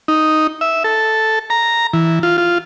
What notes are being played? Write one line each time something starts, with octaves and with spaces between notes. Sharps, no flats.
D#4
E5
A4
A#5
E3
F4
F4